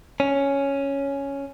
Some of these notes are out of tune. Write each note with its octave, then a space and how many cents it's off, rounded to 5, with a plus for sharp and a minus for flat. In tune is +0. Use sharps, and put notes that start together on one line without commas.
C#4 +5